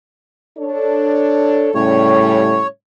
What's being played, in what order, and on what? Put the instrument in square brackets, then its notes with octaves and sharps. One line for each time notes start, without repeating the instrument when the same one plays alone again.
[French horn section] D4 A4 C#5
[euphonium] A2 [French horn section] C#3 G3 C#4 [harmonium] C#5